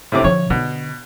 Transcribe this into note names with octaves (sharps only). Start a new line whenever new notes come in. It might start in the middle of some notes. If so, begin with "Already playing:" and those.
A2 C3 D6
D3 F3 C#5
B2 D3